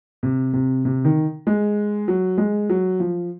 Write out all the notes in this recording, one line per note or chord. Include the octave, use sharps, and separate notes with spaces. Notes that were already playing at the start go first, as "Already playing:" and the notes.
C3
C3
C3
D#3
G#3
F#3
G#3
F#3
F3